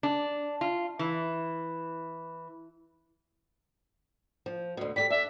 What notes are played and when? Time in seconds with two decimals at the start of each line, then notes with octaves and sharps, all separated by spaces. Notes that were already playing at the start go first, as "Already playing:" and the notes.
0.03 D4
0.61 F4
0.99 E3
4.46 F3
4.77 D2 B2
4.96 G3 G4 A4 B6
5.10 D4 E5